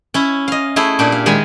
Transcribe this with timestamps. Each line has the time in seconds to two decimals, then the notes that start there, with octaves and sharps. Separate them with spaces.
0.14 C#4 E4
0.48 D#5 F5
0.76 A3 E4 G#4
0.99 A#2 D4 G4
1.12 F5
1.26 D#3 G#3 F5 G#5 B5